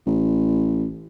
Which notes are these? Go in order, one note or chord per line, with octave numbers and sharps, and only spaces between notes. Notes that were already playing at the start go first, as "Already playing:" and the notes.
A1